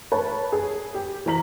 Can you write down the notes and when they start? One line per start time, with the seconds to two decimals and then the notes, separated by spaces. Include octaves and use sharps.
0.12 A#4 B4 C#5 A5
0.52 G#4
0.94 G4
1.26 E3 C5 A#5 B6 F#7